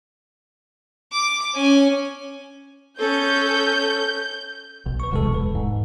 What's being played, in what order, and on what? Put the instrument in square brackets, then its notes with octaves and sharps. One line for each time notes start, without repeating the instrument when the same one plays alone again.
[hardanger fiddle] D6
C#4 G#5
[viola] C#4 A4 [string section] G6
[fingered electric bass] B1
[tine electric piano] B4 C#6
[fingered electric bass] D1 B1 E2 [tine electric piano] C3 G#3 A4
[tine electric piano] B4
G#2